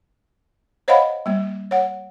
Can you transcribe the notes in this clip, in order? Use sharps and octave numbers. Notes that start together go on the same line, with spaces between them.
C5 C#5 D#5 F5 F#5 B5
G3 A#3
C#5 F#5